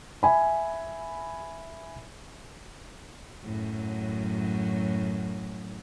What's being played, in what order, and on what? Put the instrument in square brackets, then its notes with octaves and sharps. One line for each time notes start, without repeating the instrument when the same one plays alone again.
[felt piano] E5 G#5 B5
[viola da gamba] F#2 A2 F#3